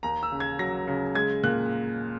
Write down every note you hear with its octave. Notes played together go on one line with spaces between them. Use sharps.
D#2 A#5
E6
C#3
G#6
F#3 A#6
C#3
G#3 G#6
A#2 F#6